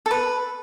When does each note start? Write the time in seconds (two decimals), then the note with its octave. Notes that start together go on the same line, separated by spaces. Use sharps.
0.06 A4
0.11 B4